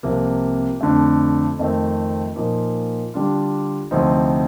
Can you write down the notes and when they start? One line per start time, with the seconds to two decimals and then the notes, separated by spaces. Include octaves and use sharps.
0.03 C2 C3 F3 A#3
0.81 F2 D3 A3
1.59 F2 D#3 A3 C4
2.36 A#2 F3 A#3 D#4
3.14 D3 G3 D4 F4
3.91 D2 C3 F3 C4 D#4